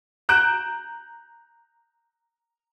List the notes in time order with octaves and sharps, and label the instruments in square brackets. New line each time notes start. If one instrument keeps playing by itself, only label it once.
[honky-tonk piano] A#5 F#6 G6 D7 E7